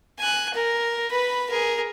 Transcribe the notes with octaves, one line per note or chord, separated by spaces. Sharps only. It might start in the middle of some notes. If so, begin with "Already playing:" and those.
G#5 F#6
A#4
B4 B5
G#4 A#4